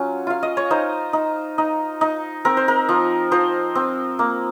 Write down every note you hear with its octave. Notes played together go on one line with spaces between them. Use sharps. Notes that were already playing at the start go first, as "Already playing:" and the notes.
Already playing: F#3 C#4 F4
F4 F5
D#5
C#5
D#4 C5
D#4
D#4
D#4
C4 A#4
C5
A#4
F3
F3 C5
C4
A#3